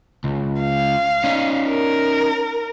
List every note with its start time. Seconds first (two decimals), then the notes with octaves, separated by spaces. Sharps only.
0.24 C#2
0.61 F5
1.24 C#4 D#4
1.69 A#4